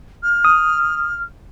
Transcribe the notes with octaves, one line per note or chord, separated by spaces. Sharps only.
F6
D#6